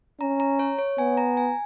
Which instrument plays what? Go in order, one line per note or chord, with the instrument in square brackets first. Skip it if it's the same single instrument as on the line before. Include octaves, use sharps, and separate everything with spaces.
[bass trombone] C#4 [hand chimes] A#5
[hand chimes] A#5
C#5
C#5
[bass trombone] B3 [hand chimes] G#5
[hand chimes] A#5
G#5